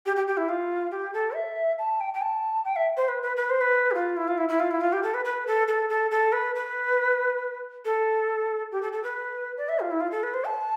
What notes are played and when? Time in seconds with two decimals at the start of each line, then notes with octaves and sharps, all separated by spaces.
0.06 G4
0.16 G4
0.27 G4
0.37 E4
0.49 F4
0.91 G4
1.14 A4
1.34 E5
1.78 A5
2.00 G5
2.14 G5
2.22 A5
2.65 G5
2.76 E5
2.97 C5
3.08 B4
3.23 B4
3.36 B4
3.50 C5
3.61 B4
3.91 G4
3.94 F4
4.17 E4
4.28 F4
4.37 E4
4.49 E4
4.60 F4
4.71 E4
4.81 F4
4.92 G4
5.03 A4
5.14 B4
5.25 B4
5.47 A4
5.68 A4
5.89 A4
6.11 A4
6.32 B4
6.55 B4
7.85 A4
8.72 G4
8.82 A4
8.93 A4
9.04 B4
9.57 D5
9.69 E5
9.80 F4
9.91 E4
10.00 F4
10.11 A4
10.23 B4
10.34 C5
10.45 A5